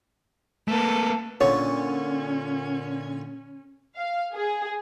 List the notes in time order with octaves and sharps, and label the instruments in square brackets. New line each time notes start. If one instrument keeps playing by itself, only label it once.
[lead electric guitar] A3 A#3 [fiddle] A4 B4
[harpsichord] A#2 D3 [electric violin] C#4 [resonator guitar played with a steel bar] C#5
[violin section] F5
G#4